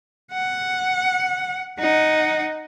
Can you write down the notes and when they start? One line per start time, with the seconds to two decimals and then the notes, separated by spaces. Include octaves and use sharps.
0.32 F#5
1.79 D#4 F#5